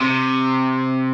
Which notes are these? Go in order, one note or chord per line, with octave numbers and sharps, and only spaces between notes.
C3